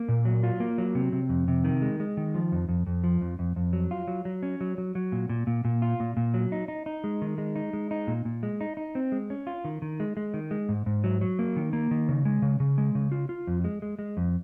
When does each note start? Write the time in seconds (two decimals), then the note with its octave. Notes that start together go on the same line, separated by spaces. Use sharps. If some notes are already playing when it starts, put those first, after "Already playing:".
Already playing: A#3
0.09 A#2
0.25 F#3
0.43 F4
0.60 A#3
0.78 F#3
0.95 C3
1.12 C3
1.29 F2
1.48 C3
1.64 D#3
1.82 G#3
2.00 G#3
2.17 D#3
2.35 F3
2.52 F2
2.68 F2
2.87 F2
3.04 F3
3.21 F2
3.39 F2
3.56 F2
3.73 F#3
3.91 F4
4.08 F#3
4.25 F#3
4.43 C#4
4.61 F#3
4.78 F#3
4.95 F#3
5.12 A#2
5.29 A#2
5.47 A#2
5.65 A#2
5.82 F4
6.00 A#2
6.17 A#2
6.34 F#3
6.52 D#4
6.68 D#4
6.86 D#4
7.04 G#3
7.22 D#3
7.38 G#3
7.56 D#4
7.73 G#3
7.91 D#4
8.07 A#2
8.25 A#2
8.43 G#3
8.61 D#4
8.77 D#4
8.95 C4
9.12 G#3
9.30 C#4
9.47 F4
9.65 D#3
9.82 D#3
10.00 G#3
10.17 G#3
10.34 D#3
10.51 G#3
10.69 G#2
10.86 G#2
11.04 F#3
11.21 F#3
11.39 A#3
11.56 D#3
11.73 A#3
11.91 D#3
12.09 C#3
12.25 G#3
12.42 C#3
12.60 C#3
12.78 G#3
12.95 C#3
13.12 F4
13.29 F4
13.47 F2
13.64 G#3
13.82 G#3
13.99 G#3
14.17 F2